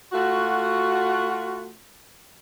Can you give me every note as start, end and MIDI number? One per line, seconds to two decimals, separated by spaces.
0.13 1.72 57
0.13 1.72 65
0.13 1.72 66